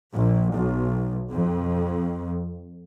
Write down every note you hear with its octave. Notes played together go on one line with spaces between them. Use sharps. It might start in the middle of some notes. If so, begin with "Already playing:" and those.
A#1
B1
F2